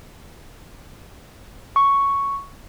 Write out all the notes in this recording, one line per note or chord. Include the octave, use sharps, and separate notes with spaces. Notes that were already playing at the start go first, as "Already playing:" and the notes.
C#6